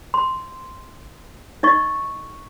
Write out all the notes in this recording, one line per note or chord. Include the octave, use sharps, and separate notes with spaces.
C6
D#4 D#5 C#6